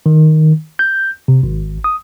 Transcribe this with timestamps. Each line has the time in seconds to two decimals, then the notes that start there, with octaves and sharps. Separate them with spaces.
0.06 D#3
0.79 G6
1.28 C3
1.43 G#1
1.84 D#6